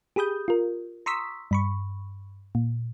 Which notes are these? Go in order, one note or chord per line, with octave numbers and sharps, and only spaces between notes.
G4 G#4 B5 D#6 G6
F4 A#4
A#5 C6 C#6 D#6 E6 B6
G2 B5 C#6
A#2